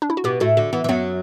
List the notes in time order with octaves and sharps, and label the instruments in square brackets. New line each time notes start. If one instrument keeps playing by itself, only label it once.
[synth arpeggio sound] D4
E4
F#4
[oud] B2 B3 [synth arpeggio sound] G4
[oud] A2 A3 [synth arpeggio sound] F#4
[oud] D3 [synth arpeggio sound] F#4
[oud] E3 [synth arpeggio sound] B3
[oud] E3
[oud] F#2 F#3 [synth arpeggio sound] B3